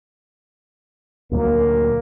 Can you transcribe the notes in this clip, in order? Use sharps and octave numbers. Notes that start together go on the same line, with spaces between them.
D2 A#2 F#3 A#3